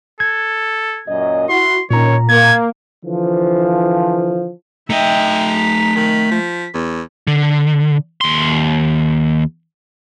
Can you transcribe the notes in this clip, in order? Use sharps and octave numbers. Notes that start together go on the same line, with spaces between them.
A4 G#6
F#2 A#2 D#5
E4 F#4 C6
A#2 D#3 C#4 C#5 A#5
A#3 G#6
D3 E3 F3
A3 D#4 D#5 E5 G5
B6
D#3
F3
E2
D3
D#2 C6